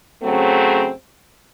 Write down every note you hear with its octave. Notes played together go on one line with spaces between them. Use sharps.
C#3 F#3 A3 C4